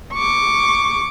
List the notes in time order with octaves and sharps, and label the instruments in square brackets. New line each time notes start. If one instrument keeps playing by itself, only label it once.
[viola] C#6 D6